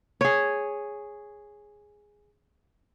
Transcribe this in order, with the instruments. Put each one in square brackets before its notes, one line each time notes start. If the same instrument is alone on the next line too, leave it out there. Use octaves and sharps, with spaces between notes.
[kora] G#4 C#5